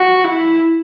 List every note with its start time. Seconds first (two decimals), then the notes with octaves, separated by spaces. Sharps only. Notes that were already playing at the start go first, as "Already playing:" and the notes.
Already playing: F#4
0.25 E4